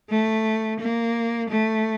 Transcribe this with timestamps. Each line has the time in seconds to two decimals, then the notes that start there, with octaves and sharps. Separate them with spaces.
0.10 A3
0.80 A#3
1.50 A3